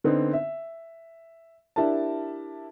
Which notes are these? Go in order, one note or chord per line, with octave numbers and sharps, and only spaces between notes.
D3 B3 C4 D#4
E5
D4 E4 G4 A#4 A5